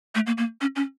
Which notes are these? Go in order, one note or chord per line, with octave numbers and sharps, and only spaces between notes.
A3
A#3
A#3
C#4
C#4